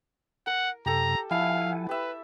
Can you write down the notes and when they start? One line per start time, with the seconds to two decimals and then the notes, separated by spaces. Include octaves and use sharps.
0.47 A#4 F#5
0.86 F#2 C3 G4 A4 A#5
1.31 F3 E4 F5 F#5 G#5 A5
1.89 G4 B4 E5